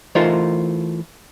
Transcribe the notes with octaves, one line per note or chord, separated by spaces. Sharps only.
E3 A3 D#4 F4 A#4 C5